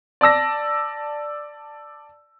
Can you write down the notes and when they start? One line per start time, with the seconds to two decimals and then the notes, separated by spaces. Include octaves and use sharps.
0.21 D5 A5 E6 A#6